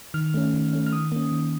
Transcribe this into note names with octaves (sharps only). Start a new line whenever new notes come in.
D#3 F6
A3 C#4
D#3
A3 C#4
F6
D#3 D#6
A#3 C#4
D#3